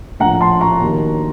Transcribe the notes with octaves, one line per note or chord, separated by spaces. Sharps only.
A#1 A2 F3 F#5 A#5
A5 C6
A#5 C#6
D#2 D#3 F#3